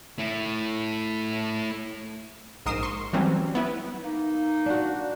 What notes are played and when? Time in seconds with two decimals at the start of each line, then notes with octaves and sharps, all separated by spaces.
0.18 A3 E4
2.66 A#1 G#2 A#4 D#6 C7 E7
2.83 C6 C#6
3.13 E3 F#3 G3 A3 C4 C#4
3.55 B3 E4 B4
4.03 A#3 D#4
4.66 D4 F#4